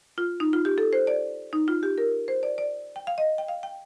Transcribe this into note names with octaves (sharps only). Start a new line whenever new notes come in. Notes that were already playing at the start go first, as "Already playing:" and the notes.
F4
D#4
F4
G4
A4
C5
D5
D#4
F4
G4
A#4
C5
D5
D5
G5
F5
D#5
G5
F5
G5